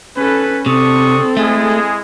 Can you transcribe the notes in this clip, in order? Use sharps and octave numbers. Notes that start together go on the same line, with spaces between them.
C#4 A4 B4
C3 C4 D4 A4 C#6 D#6
G#3 A3 E4 G#4